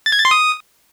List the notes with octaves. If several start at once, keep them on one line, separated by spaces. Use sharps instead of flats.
A6
G#6
A6
C6
D#6